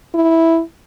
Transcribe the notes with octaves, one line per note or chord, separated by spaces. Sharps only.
E4